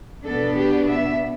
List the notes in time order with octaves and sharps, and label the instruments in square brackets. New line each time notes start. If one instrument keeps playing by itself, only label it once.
[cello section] B2 B3 D4 A4
G4
E5